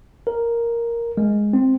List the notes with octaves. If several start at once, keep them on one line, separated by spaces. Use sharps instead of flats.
A#4
G#3
C4